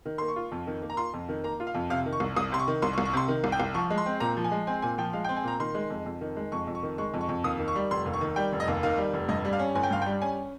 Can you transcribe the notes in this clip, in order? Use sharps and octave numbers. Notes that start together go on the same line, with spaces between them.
D#3
A#3 C6
C#6
F4
F2
D#3
A#3
A#5
F4 C6
F2
D#3
A#3 A#5
F4
F5
F2
C3 F5
D#3
C#6
C2
C2 D#6
C3 C6
C#6
D#3
C2 C6
C#6
C2
C#6
C3 C6
D#3
C2
G5
C2
F3 C#6
G#3
C6
C4
A#2 A#5
F3
G#5
G#3
C4 G#5
A#2 G#5
F3 G5
G#3 F5
G5
C4
G#5
A#2 A#5
D#3 C6
G#3
F2
F2
D#3
G#3
F2 C#6
F2
C#6
D#3
G#3 C#6
F2
C#6
F2
D#2 D#6
D#3
C#6
G3
F1 C6
D#2
C#6
D#3
G3 G5
F1
D#5
D#2
D#3 F5
G3
F1
G2 D#5
G3
F5
C#4
G1 G#5
G5
G2 F5
G5
G3
C#4 G#5